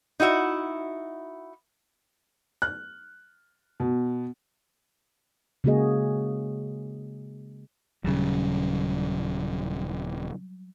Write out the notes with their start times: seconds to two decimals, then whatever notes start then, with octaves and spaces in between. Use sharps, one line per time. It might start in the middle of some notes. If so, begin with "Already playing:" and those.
0.20 D#4 E4 F#4 E5
2.62 F#6
3.80 B2
5.64 C#3 G#3 A#3 F#4 G#4 D#5
8.04 D#1 C#3 F#3 G3